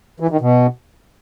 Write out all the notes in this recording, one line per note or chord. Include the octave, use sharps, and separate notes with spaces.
E3
D#3
B2